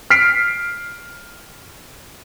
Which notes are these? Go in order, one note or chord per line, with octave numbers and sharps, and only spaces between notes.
F6 B6 C7 D7